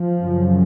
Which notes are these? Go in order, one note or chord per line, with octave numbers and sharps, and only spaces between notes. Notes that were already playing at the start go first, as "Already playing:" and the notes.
Already playing: F3
F#2 C#3